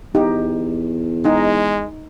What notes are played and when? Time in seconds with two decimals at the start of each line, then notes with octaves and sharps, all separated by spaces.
0.15 E2 D#4 G4
1.25 G#3 D#4